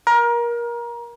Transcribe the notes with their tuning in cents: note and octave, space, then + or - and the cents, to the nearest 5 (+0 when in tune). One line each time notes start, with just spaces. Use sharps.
A#4 +25